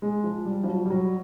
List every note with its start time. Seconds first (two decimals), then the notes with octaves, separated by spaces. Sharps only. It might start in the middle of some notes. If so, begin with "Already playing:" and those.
0.02 G#3
0.24 F3
0.45 G3
0.64 F3
0.67 F#3
0.85 G3
0.90 F#3